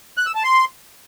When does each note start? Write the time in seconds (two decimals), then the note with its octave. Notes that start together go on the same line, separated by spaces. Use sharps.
0.18 F#6
0.26 E6
0.35 A5
0.44 C6